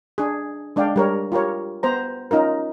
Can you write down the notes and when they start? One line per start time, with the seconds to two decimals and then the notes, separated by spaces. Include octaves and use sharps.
0.18 D4 G#4
0.76 G#3 D4 D5 F5 G5
0.96 G3 A#4 C#5
1.32 F4 G4 A#4 C#5
1.83 B3 C5 A#5
2.31 C#4 D#4 F4 A#4